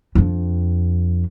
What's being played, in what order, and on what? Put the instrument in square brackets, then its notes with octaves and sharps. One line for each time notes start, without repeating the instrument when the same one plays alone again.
[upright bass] F2 D4